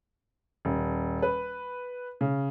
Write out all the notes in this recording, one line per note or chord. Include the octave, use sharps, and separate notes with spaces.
D#1
B4
C#3